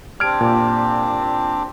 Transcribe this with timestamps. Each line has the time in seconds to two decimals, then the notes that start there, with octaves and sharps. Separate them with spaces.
0.20 C4 D4 G4 F6 G#6 D7
0.41 A#2